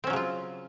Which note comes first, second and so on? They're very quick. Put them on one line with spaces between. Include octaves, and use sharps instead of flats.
C4 C#4 F#3 C#3 F4